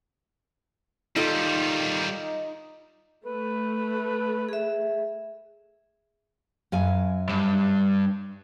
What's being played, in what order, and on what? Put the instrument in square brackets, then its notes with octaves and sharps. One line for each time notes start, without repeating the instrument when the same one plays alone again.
[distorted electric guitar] D#3 G3 [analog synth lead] D#4 [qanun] F4 A4 D#5
[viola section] A3 [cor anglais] B4
[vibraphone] G#4 E5
[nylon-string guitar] F#2 F5 G#5
[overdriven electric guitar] G2